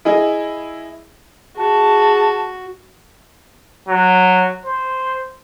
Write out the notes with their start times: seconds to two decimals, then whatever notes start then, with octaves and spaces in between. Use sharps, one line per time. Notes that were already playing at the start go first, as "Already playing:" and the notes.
0.05 E4 G#4 D#5
1.57 F#4 G#4 A5
3.88 F#3
4.66 C5